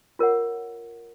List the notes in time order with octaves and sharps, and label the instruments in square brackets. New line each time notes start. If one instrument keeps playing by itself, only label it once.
[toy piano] F4 A#4 C#5 F#5